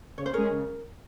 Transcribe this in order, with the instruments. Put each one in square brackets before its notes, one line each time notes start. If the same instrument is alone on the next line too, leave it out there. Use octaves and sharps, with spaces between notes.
[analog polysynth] C#3 [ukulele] C#5
[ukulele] C5
[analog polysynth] G#3 C#4 G#4 [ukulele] A#4 C#5
[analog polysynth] C#3